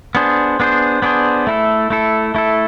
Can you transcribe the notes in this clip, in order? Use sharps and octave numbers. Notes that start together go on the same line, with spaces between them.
B3 D4 G#4 C5
B3 D4 G#4 C5
B3 D4 G#4 C5
A3 E4 A4
A3 E4 A4
A3 E4 A4